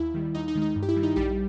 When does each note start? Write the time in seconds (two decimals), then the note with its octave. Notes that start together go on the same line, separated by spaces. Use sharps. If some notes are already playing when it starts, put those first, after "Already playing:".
Already playing: D#2 E4
0.14 D#3 G3
0.35 D#2 D#4
0.48 D#4
0.55 D#3 G#3
0.62 D#4
0.76 G2
0.82 G4
0.89 E4
0.96 D#3 G3
1.03 D#4
1.16 A#1 G3 G4